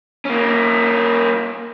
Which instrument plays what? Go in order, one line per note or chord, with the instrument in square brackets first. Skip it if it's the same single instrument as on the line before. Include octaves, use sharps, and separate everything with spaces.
[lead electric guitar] A#3 C#4